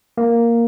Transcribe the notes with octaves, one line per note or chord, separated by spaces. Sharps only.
A#3